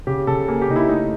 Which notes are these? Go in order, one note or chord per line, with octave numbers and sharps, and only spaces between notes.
C#3 G4
C#3 A4
A#3 G#4
G4
C#3 D#4
E4
A3 D#4